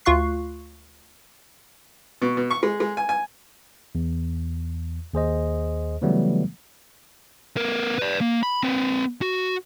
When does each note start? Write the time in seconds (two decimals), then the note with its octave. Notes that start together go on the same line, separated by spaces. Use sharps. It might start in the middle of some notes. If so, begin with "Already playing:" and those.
0.05 D2 F4 F5 C#6 F#6 C7
2.22 B2
2.37 B2
2.51 C#6
2.63 G#3
2.80 G#3
2.97 G#5
3.09 G#5
3.95 E2
5.14 D#2 G#4 C5 D#5
6.02 C#3 E3 F#3 G3 A3 B3
7.56 B3 A#4
7.99 B4 D5
8.21 A#3
8.43 B5
8.63 C4 B4
9.22 F#4